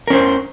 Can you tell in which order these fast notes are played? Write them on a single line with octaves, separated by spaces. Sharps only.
A#4 C#4 C5